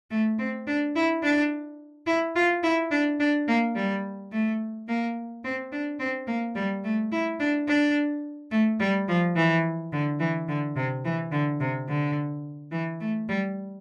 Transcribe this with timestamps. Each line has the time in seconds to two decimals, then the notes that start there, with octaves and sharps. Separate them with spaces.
0.11 A3
0.39 C4
0.67 D4
0.96 E4
1.23 D4
2.07 E4
2.35 F4
2.63 E4
2.91 D4
3.20 D4
3.48 A#3
3.75 G3
4.32 A3
4.88 A#3
5.44 C4
5.72 D4
5.99 C4
6.27 A#3
6.55 G3
6.84 A3
7.12 E4
7.40 D4
7.68 D4
8.51 A3
8.80 G3
9.08 F3
9.36 E3
9.93 D3
10.20 E3
10.48 D3
10.76 C3
11.05 E3
11.32 D3
11.60 C3
11.88 D3
12.72 E3
13.00 A3
13.28 G3